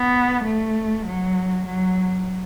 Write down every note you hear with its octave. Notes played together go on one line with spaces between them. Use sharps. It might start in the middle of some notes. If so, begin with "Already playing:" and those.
Already playing: B3
A3
F#3
F#3